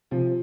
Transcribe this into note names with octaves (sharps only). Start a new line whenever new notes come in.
C3 F3